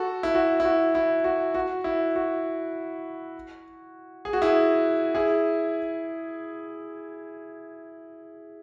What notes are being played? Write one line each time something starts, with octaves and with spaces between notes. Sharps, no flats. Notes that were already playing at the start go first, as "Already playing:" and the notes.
Already playing: F#4 A4
E4
F#4
E4
F#4
E4
F#4
F#4
E4
F#4
G#4
F#4
E4 G#4
E4 G#4